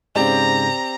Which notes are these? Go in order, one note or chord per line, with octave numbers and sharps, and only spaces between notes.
G#2 C#3 C4 G4 D5 A#5